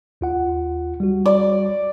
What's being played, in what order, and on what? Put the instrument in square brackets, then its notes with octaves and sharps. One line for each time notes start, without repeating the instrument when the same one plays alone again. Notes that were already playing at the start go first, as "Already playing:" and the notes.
[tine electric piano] D#2 F4 F#5
G3 F#4
[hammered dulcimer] D5